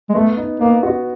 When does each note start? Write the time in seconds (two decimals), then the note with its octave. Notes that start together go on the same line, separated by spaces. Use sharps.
0.09 G#3
0.14 A3 B3
0.37 D#4
0.59 A#3 B3
0.83 F#4